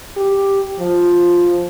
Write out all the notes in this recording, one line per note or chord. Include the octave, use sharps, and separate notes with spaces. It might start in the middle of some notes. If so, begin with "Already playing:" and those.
G4
F3